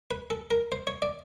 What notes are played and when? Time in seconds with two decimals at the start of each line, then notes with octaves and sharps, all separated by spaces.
0.11 B4
0.30 A4
0.51 A#4
0.72 C5
0.87 C#5
1.02 D5